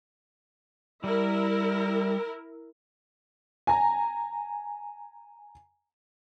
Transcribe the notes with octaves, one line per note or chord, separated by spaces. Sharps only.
G3 E4 A#4
G#5 A#5